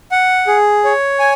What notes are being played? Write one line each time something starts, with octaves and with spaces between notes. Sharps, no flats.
F#5
G#4
C#5
G#5